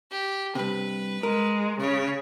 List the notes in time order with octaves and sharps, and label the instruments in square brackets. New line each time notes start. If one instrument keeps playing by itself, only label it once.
[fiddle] G4
[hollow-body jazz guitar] G2 C3 [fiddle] B4
[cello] G#3 [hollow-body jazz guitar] A#4
[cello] C#3 [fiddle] C#5